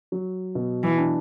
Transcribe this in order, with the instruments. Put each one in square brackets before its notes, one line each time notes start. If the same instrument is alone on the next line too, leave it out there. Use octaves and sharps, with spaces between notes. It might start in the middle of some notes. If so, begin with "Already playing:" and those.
[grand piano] F#3
B2
[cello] E3
[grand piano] D4